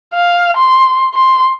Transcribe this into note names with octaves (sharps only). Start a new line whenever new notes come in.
F5
C6
C6